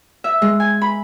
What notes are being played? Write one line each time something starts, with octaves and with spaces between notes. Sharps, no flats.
E5
G#3
G#5
B5